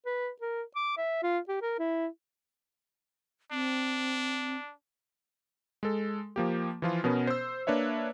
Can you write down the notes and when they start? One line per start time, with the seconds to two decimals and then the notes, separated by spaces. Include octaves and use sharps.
0.06 B4
0.42 A#4
0.76 D6
0.97 E5
1.23 F4
1.49 G4
1.62 A#4
1.79 E4
3.52 C4 D4
5.83 G#3 A4
6.36 F3 A#3 G4
6.82 E3 F3 F4
7.04 B2 B3 C#4 A#4
7.27 C5 E6
7.67 A#3 D4 B4 C#5 E5